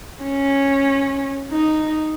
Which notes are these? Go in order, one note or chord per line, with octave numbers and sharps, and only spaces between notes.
C#4
D#4